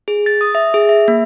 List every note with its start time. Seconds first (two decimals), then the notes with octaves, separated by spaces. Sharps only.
0.08 G#4
0.26 A6
0.41 D#6
0.55 E5
0.74 G#4
0.89 E5
1.08 A#3